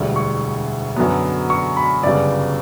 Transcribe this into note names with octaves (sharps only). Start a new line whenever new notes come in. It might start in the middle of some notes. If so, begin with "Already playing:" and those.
Already playing: E1 D2 D3 G3
C#6
F#2 D3 F#3 B3
C#6
B5
G1 F#2 C#3 G3 D5